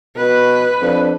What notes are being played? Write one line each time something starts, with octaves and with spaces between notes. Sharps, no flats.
B2 B4
F2 D4